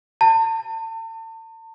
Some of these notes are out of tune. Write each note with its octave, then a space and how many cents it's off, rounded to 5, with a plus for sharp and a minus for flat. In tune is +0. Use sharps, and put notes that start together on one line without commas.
A5 +40